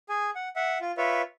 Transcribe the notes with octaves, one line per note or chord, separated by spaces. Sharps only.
G#4 G#5
F#5
E5 F#5
F4
F4 B4 C#5 E5